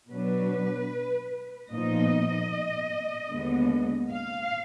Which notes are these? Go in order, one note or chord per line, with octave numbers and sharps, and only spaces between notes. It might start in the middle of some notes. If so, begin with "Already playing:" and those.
B2 F#3 D4 B4
A#2 F3 B3 D#4 D#5
D#2 D3 G#3 B3
F5